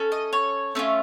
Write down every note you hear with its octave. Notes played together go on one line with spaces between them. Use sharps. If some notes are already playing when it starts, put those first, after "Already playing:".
Already playing: C#4 A4
D#5
C#5
A3 C#4 F4